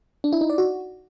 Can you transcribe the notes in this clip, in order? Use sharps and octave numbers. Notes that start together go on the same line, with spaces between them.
D4
E4
D#4
D5
F#4